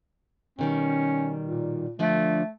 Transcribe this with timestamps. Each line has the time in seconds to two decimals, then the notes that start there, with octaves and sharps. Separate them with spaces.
0.59 B2 D#3 G3 C#4
1.46 A#2
1.99 D3 F3 A3 D4